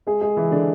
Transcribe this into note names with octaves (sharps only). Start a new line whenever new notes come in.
G#3 G#4
G#3 G#4
E3 E4
D3 D4